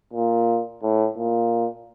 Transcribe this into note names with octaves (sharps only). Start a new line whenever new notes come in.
A#2
A2
A#2